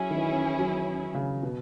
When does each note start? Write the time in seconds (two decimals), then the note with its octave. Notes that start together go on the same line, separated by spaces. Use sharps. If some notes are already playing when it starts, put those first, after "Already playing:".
Already playing: F#3 C#4 E4 G#4
0.11 D#3
0.17 E3
0.58 F#3
1.15 C#3
1.43 B2